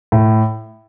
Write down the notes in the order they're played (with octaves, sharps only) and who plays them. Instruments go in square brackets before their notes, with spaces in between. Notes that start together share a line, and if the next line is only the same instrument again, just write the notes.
[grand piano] A2